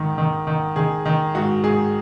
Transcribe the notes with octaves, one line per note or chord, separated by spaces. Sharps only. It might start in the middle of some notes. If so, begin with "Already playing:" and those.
Already playing: G#2 D#3
D#3
D#3
D#3 G#4
D#3
G#2 F#4
G#2 G#4